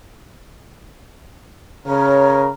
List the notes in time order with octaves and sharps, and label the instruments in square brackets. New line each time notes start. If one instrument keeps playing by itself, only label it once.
[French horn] C#3 [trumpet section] A#4 [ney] C#5